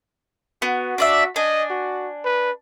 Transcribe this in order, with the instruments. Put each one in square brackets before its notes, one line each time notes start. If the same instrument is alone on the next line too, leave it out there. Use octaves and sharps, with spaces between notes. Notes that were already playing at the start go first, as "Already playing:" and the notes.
[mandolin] B3 [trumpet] F#4
[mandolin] D4 D5 E5
[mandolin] D4 G#5 [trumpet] D#5
[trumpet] F#4
B4